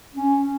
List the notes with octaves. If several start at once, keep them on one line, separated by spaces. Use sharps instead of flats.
C#4